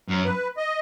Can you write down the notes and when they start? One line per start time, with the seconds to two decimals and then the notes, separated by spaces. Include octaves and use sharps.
0.08 F#2
0.25 B4
0.57 D#5